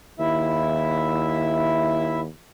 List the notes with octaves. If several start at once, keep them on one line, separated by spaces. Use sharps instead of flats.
D#2 E4 E5